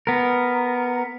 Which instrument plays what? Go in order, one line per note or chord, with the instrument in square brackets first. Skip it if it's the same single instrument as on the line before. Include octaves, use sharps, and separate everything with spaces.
[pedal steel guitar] B3 A#4